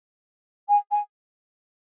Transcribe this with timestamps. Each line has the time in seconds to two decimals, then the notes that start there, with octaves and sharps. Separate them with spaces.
0.68 G#5
0.91 G#5